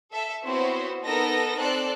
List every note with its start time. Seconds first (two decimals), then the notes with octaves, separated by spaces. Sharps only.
0.12 A4 E5
0.44 B3 C4 E4 F#4 C5 C#5
1.03 B3 D#4 A4 A#4 A#6
1.57 C4 A4 D5 F#6